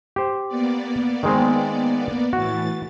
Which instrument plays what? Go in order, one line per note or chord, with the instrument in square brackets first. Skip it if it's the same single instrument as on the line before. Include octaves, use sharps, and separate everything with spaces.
[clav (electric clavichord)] G4 C5
[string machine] A#3 B3 D5
[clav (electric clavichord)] D#3 G#3 C4
[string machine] A2 E3 A6 [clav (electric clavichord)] F#4